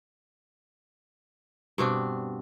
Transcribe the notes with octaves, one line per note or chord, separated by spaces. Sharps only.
G2 B2 C4 D4